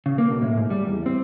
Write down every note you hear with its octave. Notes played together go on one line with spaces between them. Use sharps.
C#3
A#3
B1
A2
G#2
G3
E2
C4